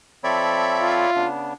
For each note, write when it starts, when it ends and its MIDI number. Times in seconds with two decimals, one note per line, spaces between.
0.24 1.06 53
0.24 1.06 60
0.24 1.06 69
0.24 1.10 73
0.24 1.10 74
0.24 1.20 76
0.24 1.10 83
0.80 1.27 65
1.16 1.53 49
1.16 1.53 59
1.16 1.53 62